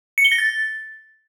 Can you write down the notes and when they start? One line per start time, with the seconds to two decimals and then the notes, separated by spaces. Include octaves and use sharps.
0.18 C#7
0.25 G7
0.32 A#6
0.38 A6